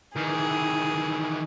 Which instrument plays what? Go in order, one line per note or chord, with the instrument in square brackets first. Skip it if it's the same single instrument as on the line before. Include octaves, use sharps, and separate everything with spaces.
[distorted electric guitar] D#3 E3 [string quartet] G#4